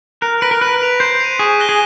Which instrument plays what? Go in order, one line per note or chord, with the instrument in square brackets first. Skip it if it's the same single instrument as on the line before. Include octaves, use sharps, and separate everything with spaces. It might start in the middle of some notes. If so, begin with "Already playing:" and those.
[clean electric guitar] A#4 [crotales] F#6
[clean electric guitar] B4 [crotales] A#6 D7
[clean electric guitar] A#4
[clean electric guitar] B4 [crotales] F#6
[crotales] B6 D7 F7
[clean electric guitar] C5 [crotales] G6
[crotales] C7 D#7
[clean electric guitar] G#4 [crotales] C#6
[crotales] F#6 A#6 D#7 G7
[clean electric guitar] G#4